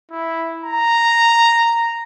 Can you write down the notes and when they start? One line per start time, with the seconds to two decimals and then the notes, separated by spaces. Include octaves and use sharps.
0.11 E4
0.65 A#5